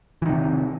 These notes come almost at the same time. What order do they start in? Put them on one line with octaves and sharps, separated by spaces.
E3 D#3 C3